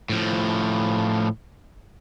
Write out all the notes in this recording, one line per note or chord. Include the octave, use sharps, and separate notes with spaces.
A2 F3